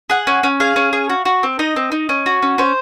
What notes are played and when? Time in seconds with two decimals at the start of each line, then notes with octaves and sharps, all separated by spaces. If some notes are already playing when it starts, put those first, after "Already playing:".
0.10 G#4 F#5
0.27 C#4
0.43 C#4
0.60 G#4 F5
0.76 C#4
0.93 G#4
1.10 F#4
1.25 F#4
1.43 C4
1.59 D#4 D#5
1.76 C4
1.92 D#4
2.09 C#4
2.26 F#4
2.42 C#4
2.58 C#4 C5